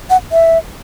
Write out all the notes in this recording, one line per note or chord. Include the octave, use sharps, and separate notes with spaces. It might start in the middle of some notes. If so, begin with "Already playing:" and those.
F#5
E5